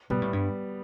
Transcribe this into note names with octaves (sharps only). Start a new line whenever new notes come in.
B2 G3 B3
A2
G2